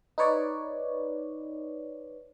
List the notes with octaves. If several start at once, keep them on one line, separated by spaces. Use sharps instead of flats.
D#4 B4 C#5 D5